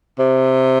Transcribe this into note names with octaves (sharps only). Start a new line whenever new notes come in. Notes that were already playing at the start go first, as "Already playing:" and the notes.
C3